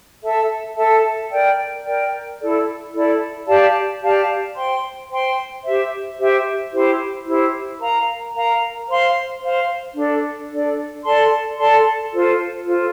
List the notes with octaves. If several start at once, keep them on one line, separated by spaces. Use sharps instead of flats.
A4 E5 A5
A4 E5 A5
A#4 D5 G5
A#4 D5 G5
E4 A4 D5
E4 A4 D5
G4 D5 F5 A5
G4 D5 F5 A5
C5 G5 C6
C5 G5 C6
G4 C5 E5
G4 C5 E5
E4 G4 C5
E4 G4 C5
A#4 F5 A#5
A#4 F5 A#5
C5 F5 C6
C5 F5 C6
D4 A4 D5
D4 A4 D5
A4 D5 A5 C6
A4 D5 A5 C6
F4 A4 C5
F4 A4 C5